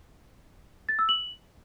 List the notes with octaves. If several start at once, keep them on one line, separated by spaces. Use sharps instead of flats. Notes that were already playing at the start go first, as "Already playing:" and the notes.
A6
E6
F#7